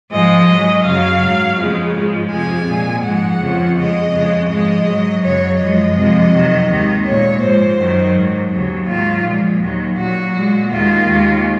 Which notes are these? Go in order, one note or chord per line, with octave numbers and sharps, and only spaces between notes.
G#2 F3 G#3 D#5
G#2 F#3
F#2 C#3 F#3 F5
G#2 F#3
F2 C#3 F3 G#3
G#2 F3 G#3
F2 C3 F3 G#3 G#5
A#2 G#3
G#2 F3 G#3 F#5
F2 C#3 F3
F2 C#3 G#3 D#5
F2 C#3 G#3
G#2 F3 G#3 D#5
G#2 F#3
F#2 C#3 F#3 C#5
F#2 F3 G#3 D#5
F2 C3 F3 G#3
F2 C3 D#3 F#3
D#2 D#3 G#3
A#2 G#3 C#5
G#2 F3 G#3 C5
F#2 D#3 F#3
G#2 F#3
D#2 C#3 F#3
G#2 D#3 F#3 F4
A#2 F3 G#3
D#2 D#3 F#3
A#2 F#3 F#4
A#2 G#3
D#2 D#3 G#3 F4
D#2 D#3 G#3